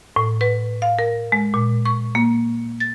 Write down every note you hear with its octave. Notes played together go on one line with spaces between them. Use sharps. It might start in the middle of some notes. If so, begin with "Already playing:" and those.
A2
B4
F5
A#4
G#3
A#2
C#6
A#3
A6